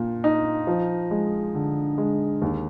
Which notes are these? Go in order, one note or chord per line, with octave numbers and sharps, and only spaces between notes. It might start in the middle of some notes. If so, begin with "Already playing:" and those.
Already playing: A#2
D#4
F3
G#3
D3
G#3
D#2